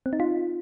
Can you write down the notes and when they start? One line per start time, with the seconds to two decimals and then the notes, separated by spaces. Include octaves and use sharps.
0.06 C4
0.13 D#4
0.20 F4